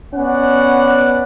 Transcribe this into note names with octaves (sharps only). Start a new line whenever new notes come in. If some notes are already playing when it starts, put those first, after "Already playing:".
B3 C#4 B4 D5 F#5